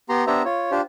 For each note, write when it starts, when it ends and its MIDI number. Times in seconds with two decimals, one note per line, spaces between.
0.09 0.24 59
0.09 0.24 67
0.09 0.24 82
0.09 0.24 84
0.27 0.42 59
0.27 0.42 62
0.27 0.42 67
0.27 0.42 72
0.27 0.42 76
0.27 0.42 82
0.45 0.71 65
0.45 0.71 73
0.71 0.81 62
0.71 0.81 65
0.71 0.81 67
0.71 0.81 72